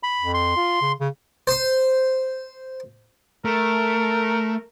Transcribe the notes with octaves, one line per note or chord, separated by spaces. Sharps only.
B5
F2
C6
F4
C#3
C#3
C5 C6
A3 A#4